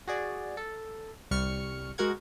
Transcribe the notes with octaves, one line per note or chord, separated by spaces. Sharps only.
F#4 G#4 D5
A4
C2 G3 C#6 F6 C#7
G#3 F#4 A#4 F#5 G#6